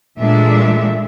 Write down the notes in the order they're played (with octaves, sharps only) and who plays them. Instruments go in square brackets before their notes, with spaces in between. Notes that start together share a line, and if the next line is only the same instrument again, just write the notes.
[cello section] A#2 E3 G#3 A3 D4 E5